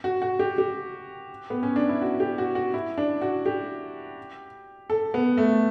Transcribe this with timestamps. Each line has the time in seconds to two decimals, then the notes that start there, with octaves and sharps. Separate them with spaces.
0.04 F#4
0.22 F#4
0.39 G4
0.58 G4
1.50 B3
1.63 C#4
1.76 D4
1.89 E4
2.02 F#4
2.20 G4
2.38 F#4
2.55 F#4
2.74 E4
2.98 D4
3.21 F#4
3.46 G4
4.90 A4
5.14 B3
5.37 A3